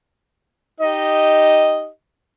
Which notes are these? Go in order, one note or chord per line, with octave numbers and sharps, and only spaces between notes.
D#4 G4 D#5